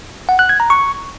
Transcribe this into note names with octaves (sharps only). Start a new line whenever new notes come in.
F#5
F#6
G#6
A#5
C#6